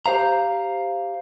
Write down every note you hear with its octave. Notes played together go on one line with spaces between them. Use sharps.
G4 C5 F5 A#5